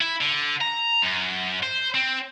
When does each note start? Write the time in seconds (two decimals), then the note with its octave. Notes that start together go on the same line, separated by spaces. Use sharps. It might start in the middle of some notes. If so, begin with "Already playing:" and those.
0.01 E4
0.21 D3
0.61 A#5
1.02 F#2
1.63 C5
1.95 C4